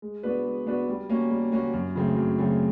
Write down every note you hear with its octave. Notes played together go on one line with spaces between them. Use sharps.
G#3
B3 D4 F#4 B4
G#3
B3 D4 F#4 B4
G3
A#3 C#4 F#4
G3
A#3 C#4 F#4
F#2
C#3 F#3 A3 C4
F#2
C#3 F#3 A3 C4